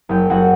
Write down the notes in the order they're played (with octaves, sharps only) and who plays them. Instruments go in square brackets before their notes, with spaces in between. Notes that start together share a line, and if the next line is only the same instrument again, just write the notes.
[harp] F#1 G4 G5
F#1 F#4 F#5